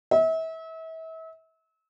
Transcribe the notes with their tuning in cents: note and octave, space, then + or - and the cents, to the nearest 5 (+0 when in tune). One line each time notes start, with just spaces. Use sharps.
E5 -35